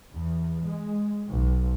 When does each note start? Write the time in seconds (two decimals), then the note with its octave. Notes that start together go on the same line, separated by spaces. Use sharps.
0.13 E2
0.67 G#3
1.30 B1